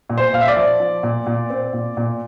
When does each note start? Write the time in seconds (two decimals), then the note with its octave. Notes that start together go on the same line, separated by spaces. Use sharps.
0.09 A#2
0.18 C5
0.33 A#2 F5
0.41 E5
0.48 D5
0.56 F3
0.80 F3
1.03 A#2
1.26 A#2
1.50 C4
1.73 A#2
1.97 A#2